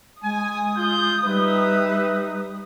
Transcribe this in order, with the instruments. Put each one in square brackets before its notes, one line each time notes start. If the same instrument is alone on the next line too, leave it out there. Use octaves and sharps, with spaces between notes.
[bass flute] G#3 [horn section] G#5 [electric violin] D#6
[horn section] F4 [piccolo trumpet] G6
[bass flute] G3 [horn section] D#4 B4 [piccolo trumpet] E5